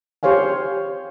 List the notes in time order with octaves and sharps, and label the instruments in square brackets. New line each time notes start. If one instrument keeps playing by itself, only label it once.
[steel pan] G4 C5 C#5 F5 G#5